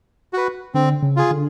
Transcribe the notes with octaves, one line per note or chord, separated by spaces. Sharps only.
F#4 B4
D3 C4
C#3
F4 G#4
D3